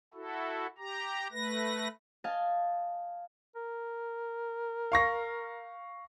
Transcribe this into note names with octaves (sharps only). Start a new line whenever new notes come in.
E4 F#4 A4
G4 A#5
A3 B4 A#6
D#5 F5 G#5 A5
A#4
F5 C#6 A#6